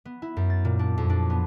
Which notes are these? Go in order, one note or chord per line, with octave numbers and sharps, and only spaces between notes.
B3
E4
F#2
A6
A#2
D4
F2
D4
B3